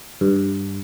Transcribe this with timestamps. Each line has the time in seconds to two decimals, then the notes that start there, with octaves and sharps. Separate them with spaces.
0.21 G2